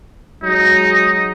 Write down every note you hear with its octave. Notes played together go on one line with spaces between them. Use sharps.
F#3 G#3 D#4